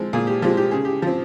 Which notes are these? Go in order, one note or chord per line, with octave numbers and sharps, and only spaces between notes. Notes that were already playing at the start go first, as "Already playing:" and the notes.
Already playing: F3 G#3 C4
A#2 G#4
G4
F3 G#3 C4 G4
G4
C#3 G#4
G4
F3 C4